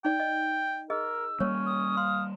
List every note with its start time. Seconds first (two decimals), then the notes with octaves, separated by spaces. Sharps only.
0.05 D#4 D5 G5
0.20 D#5
0.90 G#4 A#4 D#5 E6
1.40 G3 A#3 C#4 C#5
1.66 D#6
1.97 F5 C6